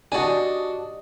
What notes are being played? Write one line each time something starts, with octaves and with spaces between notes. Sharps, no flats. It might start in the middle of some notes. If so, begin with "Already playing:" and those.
D4 F#4 G4 D5 D#5 G#5 A5